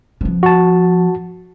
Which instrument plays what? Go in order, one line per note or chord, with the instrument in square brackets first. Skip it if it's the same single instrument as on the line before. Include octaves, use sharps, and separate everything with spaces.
[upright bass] F3 B3
[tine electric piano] F#4 A5